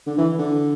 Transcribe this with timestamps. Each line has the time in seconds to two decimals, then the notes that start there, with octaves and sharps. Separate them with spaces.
0.07 D3
0.18 E3
0.39 D3